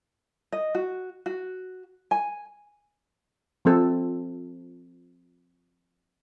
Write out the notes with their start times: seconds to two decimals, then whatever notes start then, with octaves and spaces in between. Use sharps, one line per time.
0.52 D#5
0.75 F#4
1.26 F#4
2.11 G#5
3.65 F3 C4 A4